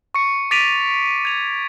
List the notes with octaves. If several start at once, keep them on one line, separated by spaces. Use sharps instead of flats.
C#6 C#7
D6 A6 B6 D7 D#7 F7
G#6 F7